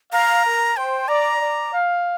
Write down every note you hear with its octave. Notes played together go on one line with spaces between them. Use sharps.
F5 A#5
A#4
C5 G5
D5 A#5
D5
F5